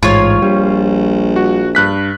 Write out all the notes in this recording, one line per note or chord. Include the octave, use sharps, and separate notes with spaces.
A1 G#2 F4 C#5
A#1 G3
F#4
G2 F#6 B6